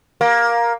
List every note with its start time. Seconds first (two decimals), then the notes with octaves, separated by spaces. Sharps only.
0.21 A#3